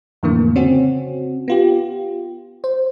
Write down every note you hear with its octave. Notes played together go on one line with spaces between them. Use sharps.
F2 A2 D3 E3 A#3
C#3 C4 C#4 F#4
B3 F4 G4
C5